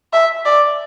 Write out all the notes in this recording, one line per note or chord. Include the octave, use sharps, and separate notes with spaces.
E5
D5